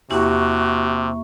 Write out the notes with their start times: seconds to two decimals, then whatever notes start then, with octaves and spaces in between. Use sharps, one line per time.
0.11 E2 C3 A#3 E4 F#4 G4 E5 C#6